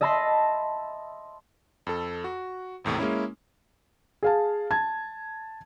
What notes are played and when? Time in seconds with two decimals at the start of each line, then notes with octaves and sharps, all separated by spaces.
0.01 D#5 E5 A5 B5 C6 A#6
1.87 F2 A4
2.24 F#4
2.84 G#1 E2 A2 C3
2.98 G#3 A#3 C#4 E4
4.23 G#4 F5 A5
4.71 A5 G#6